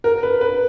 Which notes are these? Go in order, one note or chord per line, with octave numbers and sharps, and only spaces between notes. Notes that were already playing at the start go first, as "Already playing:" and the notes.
A#4
B4
B4